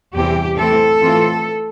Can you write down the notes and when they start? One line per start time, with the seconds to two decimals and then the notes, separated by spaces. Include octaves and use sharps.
0.14 E2 C3 E3 G3 G4
0.57 E3 A3 C4 E4 A4
1.02 E3 A3 C4 F4